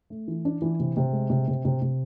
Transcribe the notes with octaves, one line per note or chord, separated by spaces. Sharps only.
A3
E3
D4
E3
C3
C3
G#3
C3
C3
C3
C3